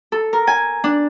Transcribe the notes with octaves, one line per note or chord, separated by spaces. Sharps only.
A4
A#4
G#5
D4